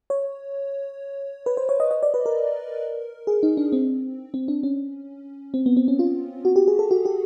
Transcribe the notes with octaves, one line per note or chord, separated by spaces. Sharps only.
C#5
B4
C5
C#5
D#5
D#5
D5
B4
A#4
G#4
D#4
D4
C4
C4
D4
C#4
C4
B3
C4
C#4
F4
F#4
G4
G#4
A4
F#4
G4